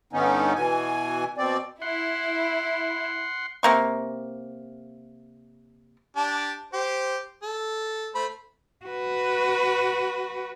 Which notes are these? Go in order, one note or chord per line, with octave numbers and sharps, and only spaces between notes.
G2 D3 B3 C#4 D#4
B2 E3 G#5
B2 C4 D5
E4 F#5 C6
C3 A#3 C#6
D4 G4 A5
G4 C5
A4
A3 C5 B5
F#4 B4